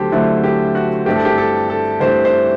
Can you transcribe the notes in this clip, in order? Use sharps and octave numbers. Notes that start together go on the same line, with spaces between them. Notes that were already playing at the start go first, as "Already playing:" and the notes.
Already playing: D2 D3 F#3 C4 G4 A4 C5
D2 D3 F#3 A3 C4 E4
G4
F#4
G2 E3 A3 C4 G4
A4
G4
A4
A4
G2 E3 A3 C4 C5
C5